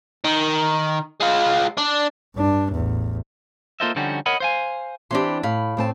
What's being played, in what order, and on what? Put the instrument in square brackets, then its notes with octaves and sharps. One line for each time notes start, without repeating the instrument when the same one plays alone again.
[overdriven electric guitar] D#3
G#3 F4
D4
[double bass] G2 D4
A1 E2
[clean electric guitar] A#3 F4 A4 C5 D#5 E5
D3 F3 G3 C#4 D#4 F#4
A#4 C#5 D#5 F#5 B5
C5 F5 G#5
[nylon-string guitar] E3 C4 D4 [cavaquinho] G4 B5 C6
[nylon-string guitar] A2 [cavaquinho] F5 B5
[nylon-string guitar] A2 C4 A5